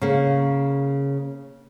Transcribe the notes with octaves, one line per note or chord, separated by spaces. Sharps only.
C#3 A#3